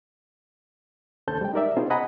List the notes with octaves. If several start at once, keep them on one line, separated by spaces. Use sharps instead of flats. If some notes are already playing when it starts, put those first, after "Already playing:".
D#2 C#4 A4 C5 A5 G6
G3 G#3 G5
D#4 G4 A#4 D5 E5
B3 C#4 D#4 F4 G#4 C5
D#5 F#5 G#5 A#5 B5 D#6